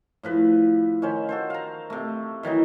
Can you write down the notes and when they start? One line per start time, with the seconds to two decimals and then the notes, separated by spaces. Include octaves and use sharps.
0.23 A2 F3 B4
1.02 D#3 C#4 C5
1.29 F#4 A4 C5
1.50 F5 A#5
1.90 C3 A3
2.43 D#3 E3 F#3 D#4